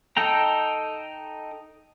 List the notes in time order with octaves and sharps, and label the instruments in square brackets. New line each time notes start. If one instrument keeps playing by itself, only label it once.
[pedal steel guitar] D#4 A4 G5 A#5